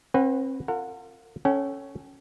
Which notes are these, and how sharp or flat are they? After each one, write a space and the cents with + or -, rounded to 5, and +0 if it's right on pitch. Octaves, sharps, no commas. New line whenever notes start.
C4 +35 B4 +0 F#5 +0
F4 +0 A#4 -40 F#5 -15
C#4 +0 A4 +0 G5 -40